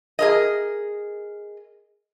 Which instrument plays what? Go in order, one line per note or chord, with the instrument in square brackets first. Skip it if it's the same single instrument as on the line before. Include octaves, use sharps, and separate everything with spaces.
[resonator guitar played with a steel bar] G#4 A#4 D#5